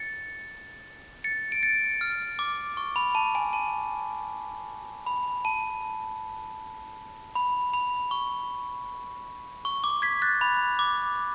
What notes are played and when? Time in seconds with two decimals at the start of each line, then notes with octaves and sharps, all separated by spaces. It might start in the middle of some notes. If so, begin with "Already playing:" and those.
Already playing: A6 C#7
1.24 A6 C#7
1.52 D7
1.63 A6 C#7
2.01 F6
2.39 D6
2.77 C#6
2.96 B5
3.15 A5
3.35 G#5
3.53 A5
5.06 B5
5.45 A5
7.35 B5
7.73 B5
8.11 C#6
9.65 C#6
9.84 D6
10.02 G#6 B6
10.22 F#6 A6
10.41 B5
10.79 D6